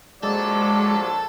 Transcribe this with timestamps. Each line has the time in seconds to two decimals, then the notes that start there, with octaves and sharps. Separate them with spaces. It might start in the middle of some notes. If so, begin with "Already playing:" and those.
0.23 A#1 F3 F#3 G#3 A4 D5